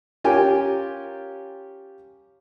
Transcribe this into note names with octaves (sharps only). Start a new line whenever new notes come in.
C#4 F4 G4 A#4 G5 G#5